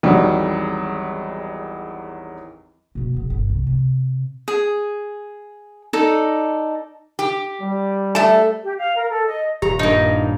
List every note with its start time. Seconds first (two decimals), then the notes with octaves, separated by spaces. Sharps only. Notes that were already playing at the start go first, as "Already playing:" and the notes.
0.03 G#1 E2 F#3 G3
2.95 B2 A#3
3.14 B1 G#2
3.30 G1
3.50 C2
3.67 C3
4.48 G#4
5.93 D#4 A4 D5
7.19 G4
7.61 G3
8.15 A3 A5
8.63 G4
8.78 F5
8.97 A#4
9.10 A4
9.26 D#5
9.62 D#1 G4 A#5
9.79 G2 A#3 D#4